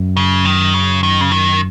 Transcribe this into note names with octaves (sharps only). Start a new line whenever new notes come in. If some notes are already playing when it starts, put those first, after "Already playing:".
Already playing: F#2
C#3
D#3
C#3
D#3
C#3
D#3